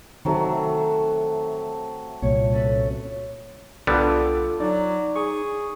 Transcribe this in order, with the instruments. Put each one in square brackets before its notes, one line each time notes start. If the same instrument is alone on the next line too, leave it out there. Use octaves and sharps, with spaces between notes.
[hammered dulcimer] C3 F#3 A3 [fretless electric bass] D#3
[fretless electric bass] C2 A#2 [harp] C#5
[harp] C#4 A4 B4
[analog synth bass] C2 [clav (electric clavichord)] D3 G3 B3 [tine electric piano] F4 A4 D6
[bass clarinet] F#3 [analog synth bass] D#4 [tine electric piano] D5
[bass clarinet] G#4 [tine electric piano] C#6